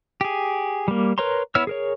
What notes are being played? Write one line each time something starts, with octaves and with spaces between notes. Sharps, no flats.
G4 G#4
G3 A#3
A#4 B4 C#5 A#5 C6
B3 E4 C#5 E6 F6
G#4 A#4 C#5